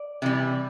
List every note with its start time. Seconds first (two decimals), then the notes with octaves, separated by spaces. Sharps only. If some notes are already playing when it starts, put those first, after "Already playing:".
Already playing: D5
0.22 C3 E3 G3